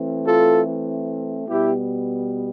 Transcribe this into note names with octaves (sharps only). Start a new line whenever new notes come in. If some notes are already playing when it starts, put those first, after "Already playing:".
Already playing: E3 A3 C4
F4 A4
B2 G3 B3 E4 G4